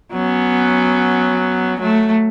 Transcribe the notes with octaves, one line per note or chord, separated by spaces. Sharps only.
F#3 B3 C#4
F#3 A3